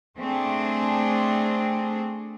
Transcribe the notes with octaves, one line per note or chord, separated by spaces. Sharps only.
A3 C4 D4 G#4